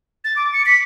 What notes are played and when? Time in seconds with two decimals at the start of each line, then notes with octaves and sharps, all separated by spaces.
0.24 A6
0.36 D6
0.53 C#7
0.66 B6